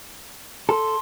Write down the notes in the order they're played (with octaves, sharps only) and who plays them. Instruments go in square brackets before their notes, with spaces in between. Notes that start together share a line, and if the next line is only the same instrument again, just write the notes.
[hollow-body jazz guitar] A4 [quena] C6